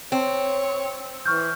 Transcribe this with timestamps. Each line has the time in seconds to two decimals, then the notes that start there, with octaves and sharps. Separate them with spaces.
0.12 C4 C#5
1.26 E3 C#6 F6 G6